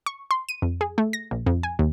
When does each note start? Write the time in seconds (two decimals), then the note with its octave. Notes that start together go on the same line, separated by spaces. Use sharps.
0.06 C#6
0.31 C6
0.49 D#7
0.62 F2
0.81 G#4
0.98 A3
1.13 A#6
1.31 A#1
1.46 F2
1.63 G#5
1.79 D#2